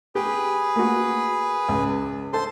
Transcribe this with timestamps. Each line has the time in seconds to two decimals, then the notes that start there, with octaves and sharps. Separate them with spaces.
0.15 G4 G#4 B4
0.76 A#3 F#4
1.68 C#2
2.33 A4 C5 A5 C6